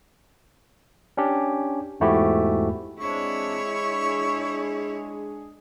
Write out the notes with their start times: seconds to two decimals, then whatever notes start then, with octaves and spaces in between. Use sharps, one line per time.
1.17 C#4 D4 G4
2.00 E2 G#2 A3 E4 F#4 G4
2.99 G#3 C4 D4 E4 C#5 C#6
3.90 D4 G#4